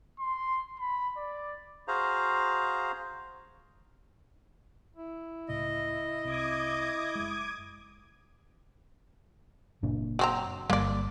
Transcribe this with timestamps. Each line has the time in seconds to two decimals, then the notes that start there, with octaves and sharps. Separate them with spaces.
0.20 C6
0.80 B5
1.17 D5
1.88 F#4 G#4 C5 F5 A#5
4.96 E4
5.48 C#2 A2 C#3 D#5
6.25 C2 C3 D6 D#6 G#6
7.15 F#1 G#3
9.83 F#1 A#2 D4
10.19 F#3 C4 A#5
10.70 G1 G3 A#3 D5